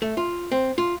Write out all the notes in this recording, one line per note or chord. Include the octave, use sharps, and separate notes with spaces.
A3
F4
C4
F4